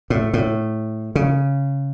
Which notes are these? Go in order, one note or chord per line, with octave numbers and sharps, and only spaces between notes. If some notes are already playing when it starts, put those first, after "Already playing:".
A2
A2
C#3